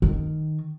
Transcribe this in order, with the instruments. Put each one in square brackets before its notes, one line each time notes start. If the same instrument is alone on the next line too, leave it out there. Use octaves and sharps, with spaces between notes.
[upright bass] D#3